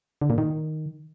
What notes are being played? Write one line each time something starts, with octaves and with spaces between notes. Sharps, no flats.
D3
A#2
D#3